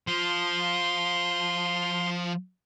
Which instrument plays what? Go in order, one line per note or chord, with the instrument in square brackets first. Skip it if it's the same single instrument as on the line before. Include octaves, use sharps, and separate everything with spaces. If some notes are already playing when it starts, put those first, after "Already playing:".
[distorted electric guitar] F3 [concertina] C6